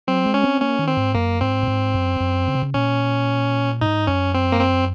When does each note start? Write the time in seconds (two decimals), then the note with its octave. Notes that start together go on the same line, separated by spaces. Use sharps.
0.07 F#3 C4
0.26 G#3
0.34 C#4
0.43 C4
0.61 A#3 C#4
0.79 D#3
0.88 C4
0.97 G#2
1.14 F#2 A#3
1.41 G#2 C4
1.63 A#2
1.67 G#2
1.94 F#2
2.20 F#2
2.48 C#3
2.55 C3
2.63 C#3
2.74 A#2 C#4
3.81 G#2 D#4
4.07 F#2 C#4
4.35 C4
4.52 A#3
4.61 C4